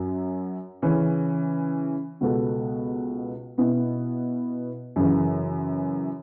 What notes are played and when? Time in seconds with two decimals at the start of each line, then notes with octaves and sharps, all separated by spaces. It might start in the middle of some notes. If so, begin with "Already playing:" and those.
Already playing: F#2 F#3
0.82 C#3 E3 C#4
2.21 C#2 B2 B3 F#4 A4
3.58 B2 B3 E4
4.96 F#2 C#3 E3